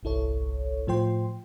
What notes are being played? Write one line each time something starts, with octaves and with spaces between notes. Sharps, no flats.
G1 C2 E4 A4 C#5
A2 F3 F4 C5 G5 C6